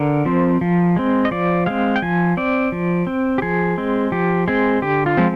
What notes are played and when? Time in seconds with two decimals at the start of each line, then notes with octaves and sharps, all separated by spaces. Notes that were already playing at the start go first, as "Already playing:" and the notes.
Already playing: D3 A#4
0.26 F3 C4
0.61 F3
0.96 G#3 C4
1.25 D#5
1.31 F3 D5
1.66 G#3 C4 F5
1.96 G5
2.02 F3 G#5
2.37 C4 D5
2.72 F3
3.07 C4
3.38 G4
3.42 F3 G#4
3.78 G#3 C4
4.12 F3 G4
4.48 G#3 C4 G#4
4.82 D3 G4
5.06 F4
5.17 F3 G#3 C4